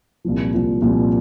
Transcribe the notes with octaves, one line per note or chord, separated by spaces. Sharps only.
C2 A#2 F3
C2 A#2 F3
C2 A#2 F3